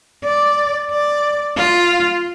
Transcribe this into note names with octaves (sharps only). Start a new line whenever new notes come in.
D5
D5
F4